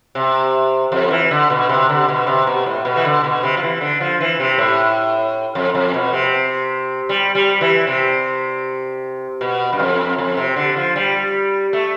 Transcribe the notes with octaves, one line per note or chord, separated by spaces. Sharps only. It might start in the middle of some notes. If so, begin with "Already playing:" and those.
C3
F2
E3
D3
B2
C3
D3
B2
C3
B2
A2
B2
E3
D3
B2
C3
F3
E3
D3
F3
E3
C3
A2
F2
F2
B2
C3
G3
G3
E3
C3
B2
G2
F2
F2
C3
D3
F3
G3
A3